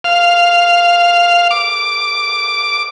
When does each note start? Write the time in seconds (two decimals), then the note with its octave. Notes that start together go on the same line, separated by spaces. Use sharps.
0.04 F5
1.51 D6